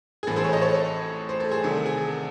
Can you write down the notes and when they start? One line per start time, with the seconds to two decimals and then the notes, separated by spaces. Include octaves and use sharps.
0.23 G#4
0.27 A1 A2 E3 C4 A4
0.36 G#4 C5
0.44 A4 C#5
0.53 C5 D#5
0.62 A4 C#5
1.29 C5
1.40 A4
1.51 G#4 C5
1.63 C2 C3 D#3 A3
1.86 G#4
1.97 A4